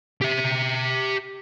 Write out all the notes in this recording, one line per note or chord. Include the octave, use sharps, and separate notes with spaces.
G4 E5